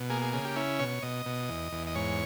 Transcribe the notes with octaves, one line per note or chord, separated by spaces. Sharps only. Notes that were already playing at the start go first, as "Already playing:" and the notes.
Already playing: B2
A#3 G#4
G#4
C#3 G#4
G4
C#4 E4
B2 C#5
B2 D#5
B2
E2
E2
D#5
G#2 C#5